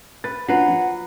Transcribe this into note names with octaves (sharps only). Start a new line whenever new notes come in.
B4 A6
F#3 D4 F4 B4 F#5 C7
F3